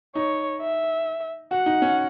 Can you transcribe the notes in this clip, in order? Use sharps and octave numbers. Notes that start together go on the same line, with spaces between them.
D#4 C#5
E5
F#4 F#5
D#4
C#4